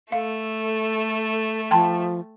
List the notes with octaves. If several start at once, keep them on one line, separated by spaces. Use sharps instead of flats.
A3 A4 F5
F3 G5 A5 C6